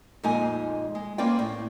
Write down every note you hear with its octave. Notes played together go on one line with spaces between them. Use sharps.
F2 A#2 G#3 D#4 D#5 G#5
G#3
A#3 C4 C#4 B4 D5 G5
A2